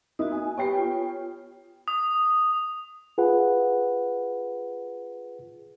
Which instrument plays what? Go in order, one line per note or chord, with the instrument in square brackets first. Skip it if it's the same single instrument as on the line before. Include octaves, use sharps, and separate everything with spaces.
[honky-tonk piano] A#3 D#4 E4 [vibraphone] F#4 D#6
[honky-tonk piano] G#5
[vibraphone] B3 G4 B4 [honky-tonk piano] C#5 G5 C7
[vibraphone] F4
[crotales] D#6
[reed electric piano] F4 G#4 B4 F#5